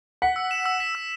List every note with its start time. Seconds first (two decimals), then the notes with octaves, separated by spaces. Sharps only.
0.22 F#5 B6
0.36 E6
0.51 E7
0.66 E6
0.80 B6
0.95 E6